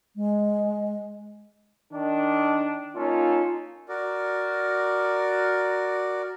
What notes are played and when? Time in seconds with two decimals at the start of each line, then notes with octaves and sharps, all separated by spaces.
0.16 G#3
1.92 D#3 D4
2.96 A#3 C#4 D#4 F4 A4
3.89 F#4 A#4 D5